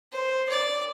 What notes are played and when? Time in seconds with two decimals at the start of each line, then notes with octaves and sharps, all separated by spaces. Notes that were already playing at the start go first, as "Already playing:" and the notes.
0.12 C5
0.49 D5